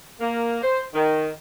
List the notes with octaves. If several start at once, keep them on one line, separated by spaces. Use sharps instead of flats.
A#3
C5
D#3